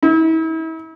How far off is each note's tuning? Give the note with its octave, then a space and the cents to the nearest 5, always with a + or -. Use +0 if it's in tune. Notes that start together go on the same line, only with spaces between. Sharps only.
E4 -40